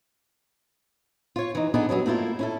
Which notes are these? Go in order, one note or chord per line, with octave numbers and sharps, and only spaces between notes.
F4 C#5
E3 D#4
B3 D4 D#4 G#4 A4 B4
F#3 G3 B3 C#4
A3 A#3 E4 F4 A#4
C#4 E4 A4